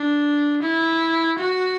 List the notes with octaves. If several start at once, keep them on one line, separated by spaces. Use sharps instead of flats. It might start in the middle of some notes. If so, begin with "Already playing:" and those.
Already playing: D4
E4
F#4